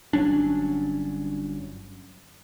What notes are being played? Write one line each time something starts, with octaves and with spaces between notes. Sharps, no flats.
G1 F#3 C#4 D4